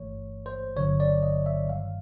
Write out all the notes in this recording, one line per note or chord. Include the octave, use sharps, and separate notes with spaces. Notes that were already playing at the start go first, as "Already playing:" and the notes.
Already playing: G1 G2 E3 A3 C#5
C5
G1 G2 D3 F#3 C#5
D5
D#5
E5
G2 D#3 G3 F5